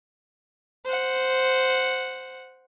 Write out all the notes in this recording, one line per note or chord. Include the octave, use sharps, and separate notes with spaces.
C5 F#5